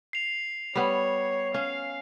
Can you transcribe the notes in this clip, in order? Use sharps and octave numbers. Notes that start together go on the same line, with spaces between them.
C7 F7
G3 B3 C#5
C#4 F5